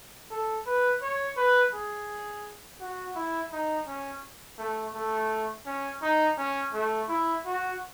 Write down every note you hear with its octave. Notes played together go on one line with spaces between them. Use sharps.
A4
B4
C#5
B4
G#4
F#4
E4
D#4
C#4
A3
A3
C#4
D#4
C#4
A3
E4
F#4